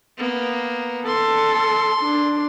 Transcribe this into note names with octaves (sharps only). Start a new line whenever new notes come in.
A#3 B3
A4 C6
D4